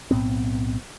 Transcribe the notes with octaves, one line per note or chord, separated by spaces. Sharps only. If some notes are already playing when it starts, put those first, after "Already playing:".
B1 A2 B3 C4